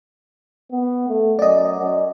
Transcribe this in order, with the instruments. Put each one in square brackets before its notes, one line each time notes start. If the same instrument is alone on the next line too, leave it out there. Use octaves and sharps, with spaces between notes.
[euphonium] B3
A3
[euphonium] F#2 [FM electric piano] D5 D#5
[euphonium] F#2